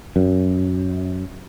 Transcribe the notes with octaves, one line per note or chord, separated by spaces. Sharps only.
F#2